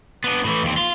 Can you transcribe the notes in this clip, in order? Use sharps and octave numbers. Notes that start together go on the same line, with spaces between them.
B3 D4
A2 E3
D#2 C4
F4